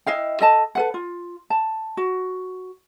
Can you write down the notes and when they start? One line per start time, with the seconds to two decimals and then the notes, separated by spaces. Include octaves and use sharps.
0.06 E4 D#5 F5 G5
0.40 A4 D#5 A5
0.75 A4 B4 F#5
0.94 F4
1.50 A5
1.97 F#4